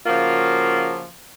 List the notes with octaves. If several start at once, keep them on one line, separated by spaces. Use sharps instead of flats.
C#3 F3 A#3 F4 F#4